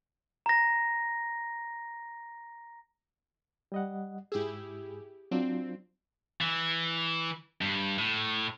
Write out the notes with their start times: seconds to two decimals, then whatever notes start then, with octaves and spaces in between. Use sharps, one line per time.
0.46 A#5 A#6
3.72 G3 D#5 F#5
4.32 G#2 E4 G4 G#4 E6
5.31 F#3 C4 D4 F4
6.41 E3
7.61 G2
7.98 A2